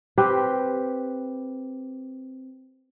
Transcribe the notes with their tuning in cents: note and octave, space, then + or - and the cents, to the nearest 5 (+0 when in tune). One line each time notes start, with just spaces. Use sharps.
C4 +0 G4 +0 B4 +0